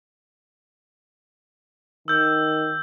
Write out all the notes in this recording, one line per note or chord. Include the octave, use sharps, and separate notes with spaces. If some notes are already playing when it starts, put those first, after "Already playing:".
D#3 E6 G6